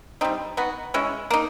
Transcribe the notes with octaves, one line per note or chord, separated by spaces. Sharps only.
G3 C4 D#4
B3 D#4 F#4
G#3 C#4 E4
A#3 D#4